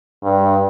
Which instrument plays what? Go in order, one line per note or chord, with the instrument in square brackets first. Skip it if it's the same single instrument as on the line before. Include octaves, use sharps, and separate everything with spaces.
[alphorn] G2